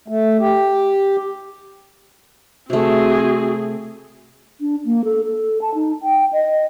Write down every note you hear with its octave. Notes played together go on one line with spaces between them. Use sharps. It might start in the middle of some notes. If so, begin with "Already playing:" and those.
A3
G4
C3 A3 C4 F#4 G#4
D4
A#3
A4
A4
A5
D#4
G5
D#5